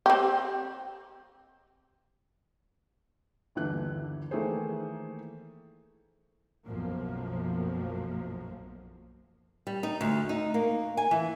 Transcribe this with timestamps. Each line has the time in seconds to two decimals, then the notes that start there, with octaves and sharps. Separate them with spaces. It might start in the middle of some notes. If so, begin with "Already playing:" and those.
0.06 C4 G4
3.55 G1 D#2 D3 E3 F#6
4.31 D#3 E3 A3 A#3 G#4 C5
6.67 B1 F#2 B2 F3 A#3
9.67 G3
9.83 D#4
10.01 D2
10.29 D#4
10.54 A#3
10.97 G#5
11.11 E3